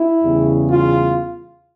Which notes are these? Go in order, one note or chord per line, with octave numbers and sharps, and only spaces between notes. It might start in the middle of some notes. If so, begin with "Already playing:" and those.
Already playing: E4
E2 C#3 G3
F4